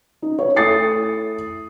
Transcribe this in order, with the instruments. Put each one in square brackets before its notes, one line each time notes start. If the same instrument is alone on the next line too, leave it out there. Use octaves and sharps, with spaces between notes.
[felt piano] D#4
C#5
A3 E4 D#6 A6 C7 C#7